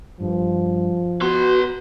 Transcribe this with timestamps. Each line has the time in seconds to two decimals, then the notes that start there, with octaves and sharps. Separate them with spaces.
0.20 G2 F3
1.21 B3 F#4 B4 C6